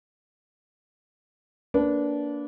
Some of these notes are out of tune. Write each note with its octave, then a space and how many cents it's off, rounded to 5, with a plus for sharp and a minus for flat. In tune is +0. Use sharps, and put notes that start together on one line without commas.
A#3 +0 D4 -20 B4 +0